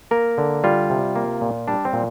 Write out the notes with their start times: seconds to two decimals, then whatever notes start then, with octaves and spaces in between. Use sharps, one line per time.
0.11 A#3 A#4
0.38 D3
0.64 G3 F4
0.90 C3
1.16 A#3
1.41 A#2
1.68 G3 D4
1.85 C4
1.93 A#2